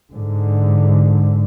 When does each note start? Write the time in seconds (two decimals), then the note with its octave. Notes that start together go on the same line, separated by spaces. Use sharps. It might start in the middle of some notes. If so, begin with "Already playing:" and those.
0.12 G#2 D3